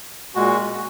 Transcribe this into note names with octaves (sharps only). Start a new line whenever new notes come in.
A#2 G#3 F#4